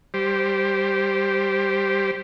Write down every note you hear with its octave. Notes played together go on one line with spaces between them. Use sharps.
G3 G4 C5